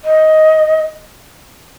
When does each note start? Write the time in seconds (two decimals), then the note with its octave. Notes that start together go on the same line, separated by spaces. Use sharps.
0.05 D#5